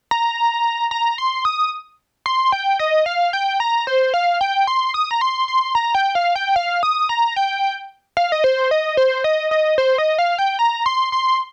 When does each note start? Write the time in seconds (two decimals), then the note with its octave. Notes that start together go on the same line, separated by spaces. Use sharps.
0.11 A#5
0.91 A#5
1.18 C6
1.45 D#6
2.26 C6
2.52 G5
2.79 D#5
3.06 F5
3.33 G5
3.60 A#5
3.87 C5
4.14 F5
4.41 G5
4.67 C6
4.94 D#6
5.11 A#5
5.21 C6
5.48 C6
5.75 A#5
5.95 G5
6.15 F5
6.36 G5
6.56 F5
6.83 D#6
7.09 A#5
7.36 G5
8.17 F5
8.32 D#5
8.44 C5
8.71 D#5
8.97 C5
9.24 D#5
9.51 D#5
9.78 C5
9.98 D#5
10.19 F5
10.39 G5
10.59 A#5
10.86 C6
11.12 C6